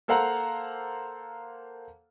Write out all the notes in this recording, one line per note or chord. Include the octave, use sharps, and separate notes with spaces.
A#3 A4 C5 F5 F#5 A#5